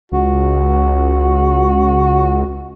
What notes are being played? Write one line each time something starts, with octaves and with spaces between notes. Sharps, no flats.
C#2 F#4